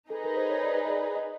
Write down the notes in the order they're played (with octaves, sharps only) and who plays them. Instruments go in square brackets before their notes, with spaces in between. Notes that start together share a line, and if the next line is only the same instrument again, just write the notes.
[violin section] D#4 G#4 B4 [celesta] A4
[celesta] A#4
C5
C#5
D5
D#5
D5
D#5